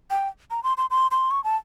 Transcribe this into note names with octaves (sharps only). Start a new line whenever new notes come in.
G5
A#5
C6
C6
C6
C6
C#6
A5